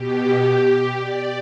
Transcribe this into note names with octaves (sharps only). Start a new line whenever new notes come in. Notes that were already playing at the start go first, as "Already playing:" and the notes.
Already playing: B2 G4
D5